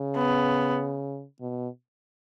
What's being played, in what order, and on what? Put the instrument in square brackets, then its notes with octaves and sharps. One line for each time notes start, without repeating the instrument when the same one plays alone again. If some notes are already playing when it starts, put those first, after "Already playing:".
Already playing: [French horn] C#3
[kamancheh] B3
[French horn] B2